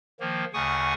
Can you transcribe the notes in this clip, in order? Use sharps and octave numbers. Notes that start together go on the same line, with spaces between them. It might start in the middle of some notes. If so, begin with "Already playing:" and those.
D#3 F3 A#3
D2 C#3 F#5 G#5 C#6 D#6